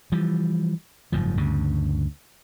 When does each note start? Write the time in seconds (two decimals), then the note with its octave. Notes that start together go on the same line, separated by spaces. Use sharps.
0.12 E3 F3 G3
1.12 F#1 G#2 F3
1.37 D2 G2 C#3